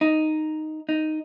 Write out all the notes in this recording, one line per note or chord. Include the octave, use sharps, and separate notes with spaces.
D#4
D#4